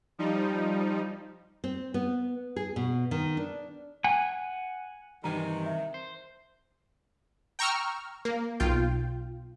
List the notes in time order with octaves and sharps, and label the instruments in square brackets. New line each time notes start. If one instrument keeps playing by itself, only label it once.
[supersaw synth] F3 G3 D#4
[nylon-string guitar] C4
B3
G#4
B2
D#3
D4
[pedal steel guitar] F#5 G#5
[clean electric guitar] G2 E3 G#5 [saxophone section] C3 D#3 [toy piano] A#5
[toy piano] E5
[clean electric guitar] C5
[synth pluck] G5 A#5 C#6 E6 F6
A#3
B1 F4 G5